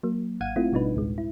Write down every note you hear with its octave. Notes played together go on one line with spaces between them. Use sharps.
F#3 A#3
G#1 F5 F#5 G#6 D#7
A3 C4 E4 F4
G#1 B2 G3 D4 D#4 B4
D2 A2 G#3
E4